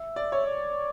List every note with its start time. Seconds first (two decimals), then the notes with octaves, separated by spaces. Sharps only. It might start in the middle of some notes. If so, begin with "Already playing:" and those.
Already playing: E5
0.16 D5
0.32 C#5
0.46 D5